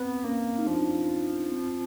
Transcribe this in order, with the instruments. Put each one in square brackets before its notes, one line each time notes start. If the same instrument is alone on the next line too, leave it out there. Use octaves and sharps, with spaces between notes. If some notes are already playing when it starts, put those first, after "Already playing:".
Already playing: [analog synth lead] B3 [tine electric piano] C4
[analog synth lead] A#3 [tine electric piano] C#4
[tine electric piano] D#4
[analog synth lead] F3 [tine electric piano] D4
[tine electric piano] C4